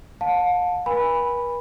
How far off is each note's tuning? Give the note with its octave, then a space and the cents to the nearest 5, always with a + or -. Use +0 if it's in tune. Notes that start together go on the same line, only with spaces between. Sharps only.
F5 +40 A5 +0
B4 -45 G#5 -30 B5 +0